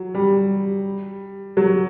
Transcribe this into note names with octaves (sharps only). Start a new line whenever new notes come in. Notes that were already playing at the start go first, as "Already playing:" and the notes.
Already playing: F#3
G3
F#3